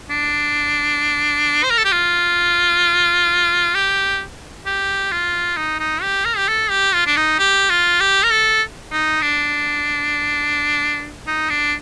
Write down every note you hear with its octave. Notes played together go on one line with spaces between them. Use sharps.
D4
C5
A#4
A4
G4
F4
G4
G4
F4
D#4
D#4
G4
A#4
G4
A4
G4
F4
D4
D#4
G4
F4
G4
A#4
A4
D#4
D4
D#4
D4